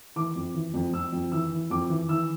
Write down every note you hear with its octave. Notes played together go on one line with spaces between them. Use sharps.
E3 D6
F2
E3
F2
F2 E6
F2
E3 E6
E3
F2 D6
E3
E3 E6